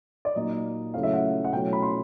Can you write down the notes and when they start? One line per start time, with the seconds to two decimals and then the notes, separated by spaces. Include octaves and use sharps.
0.25 D5
0.35 A#2 F#3 A#3 D#4 D#5
0.94 C#3 F#3 A3 C#4 E4 F5
1.03 E5
1.13 F#5
1.44 F#5
1.53 B2 F#3 A3 C#4 E4 G5
1.73 B5
1.82 C6